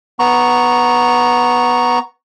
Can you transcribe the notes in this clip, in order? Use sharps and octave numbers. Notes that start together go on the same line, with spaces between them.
B3 A#5 C#6